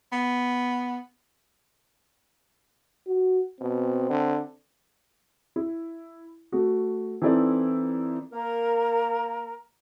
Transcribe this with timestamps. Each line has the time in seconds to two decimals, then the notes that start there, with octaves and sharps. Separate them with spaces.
0.12 B3
3.07 F#4
3.61 B2 C4
4.10 D3
5.56 E4
6.52 A3 F#4
7.22 E3 C4 D#4 E4 A4 D5
8.32 A#3 A#4